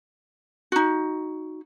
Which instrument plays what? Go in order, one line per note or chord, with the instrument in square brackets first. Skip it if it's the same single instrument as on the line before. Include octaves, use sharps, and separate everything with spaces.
[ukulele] D#4 F#4